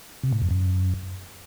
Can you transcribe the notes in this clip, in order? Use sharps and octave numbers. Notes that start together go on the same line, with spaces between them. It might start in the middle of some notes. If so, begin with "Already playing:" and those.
C3
A2
F2
F#2